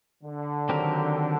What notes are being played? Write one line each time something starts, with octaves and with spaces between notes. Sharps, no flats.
D3
D#3 F#3 C4 G4 A#4